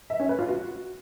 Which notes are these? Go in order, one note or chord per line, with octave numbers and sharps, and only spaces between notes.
E5
C#4
B4
F4
F#4